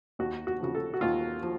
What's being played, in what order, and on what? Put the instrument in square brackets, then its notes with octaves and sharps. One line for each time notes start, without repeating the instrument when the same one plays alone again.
[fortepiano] D#2 F#4
F#4
C#3 F3 F#4
A4
F#4
D#2 F4
F3